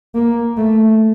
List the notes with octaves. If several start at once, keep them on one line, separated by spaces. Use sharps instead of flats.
A#3
A3